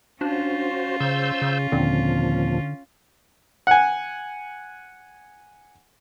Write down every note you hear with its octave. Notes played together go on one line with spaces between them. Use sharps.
C#4 D4 F4 F#4 C5
C#3 C5 E6 G6
C#3
D#2 A#2 D3 F3 C4
F#5 G#5